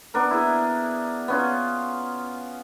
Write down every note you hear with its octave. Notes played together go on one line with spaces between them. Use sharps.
B3 D4 A#4
E4 G#4
B3 C#4 F4